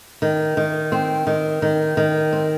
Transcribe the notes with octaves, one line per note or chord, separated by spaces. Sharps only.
D#3
D#3
C4
D#3
D#3
D#3
C4